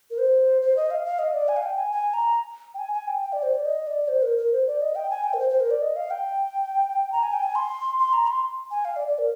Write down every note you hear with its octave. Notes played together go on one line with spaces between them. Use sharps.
A#4
C5
C5
D#5
F5
F5
D#5
D5
G#5
F5
G5
G#5
G#5
A#5
G5
G#5
G#5
G5
G5
D5
C5
D5
D#5
D5
C5
A#4
A#4
C5
D5
D#5
G5
G#5
G5
A#4
C5
C5
A#4
D5
D#5
F5
G5
A#5
G#5
G5
G#5
C6
C6
A#5
C6
G#5
F5
D5
D5
A#4